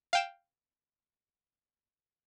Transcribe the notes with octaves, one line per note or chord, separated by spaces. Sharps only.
F5 G5 E7